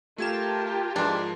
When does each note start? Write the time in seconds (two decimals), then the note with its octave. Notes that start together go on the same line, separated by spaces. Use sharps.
0.18 A3 F4 G4 A#4 A5 G#6 E7
0.96 G#2 E3 F3 D4 C6